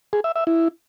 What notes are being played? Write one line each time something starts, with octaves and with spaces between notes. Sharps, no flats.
G#4
E5
E5
E4